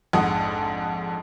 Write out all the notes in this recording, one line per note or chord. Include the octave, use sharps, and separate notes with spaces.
A#1 F2 G#2 F#5 D#6